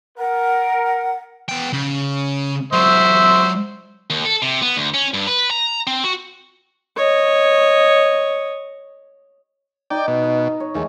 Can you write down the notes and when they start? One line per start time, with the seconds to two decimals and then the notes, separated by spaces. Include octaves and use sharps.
0.18 A#4 F#5
1.49 B3 G5
1.73 C#3
2.73 F#3 F4 C5 E5 C#6
4.10 D#2
4.25 A4
4.42 C3
4.62 B3
4.77 D2
4.94 C#4
5.14 G2
5.27 B4
5.51 A#5
5.87 C4
6.04 F#4
6.96 C#5 D#5
9.90 D#4 D5 D#5 G5
10.08 B2
10.24 D#5
10.60 C#5
10.74 D#2 E3 G#3 A3